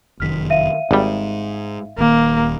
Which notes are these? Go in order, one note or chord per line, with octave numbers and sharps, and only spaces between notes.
F1 F#2 D#3 F6 B6
E5 F5 D#7
G#1 G#2 G3
D#1 D#2 D#3 A#3